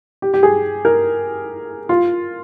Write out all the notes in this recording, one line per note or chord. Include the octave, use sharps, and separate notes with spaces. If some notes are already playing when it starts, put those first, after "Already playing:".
G4
G4
G#4
A#4
F4